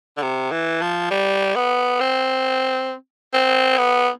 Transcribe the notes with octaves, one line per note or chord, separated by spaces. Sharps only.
D3
C3
E3
F3
G3
B3
C4
C4
B3